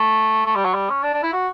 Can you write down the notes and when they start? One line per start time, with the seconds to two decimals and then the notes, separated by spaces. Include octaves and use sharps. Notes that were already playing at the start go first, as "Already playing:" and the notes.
Already playing: A3
0.46 A3
0.55 G3
0.65 F#3
0.74 G3
0.90 C#4
1.03 D4
1.14 D4
1.23 E4
1.33 F#4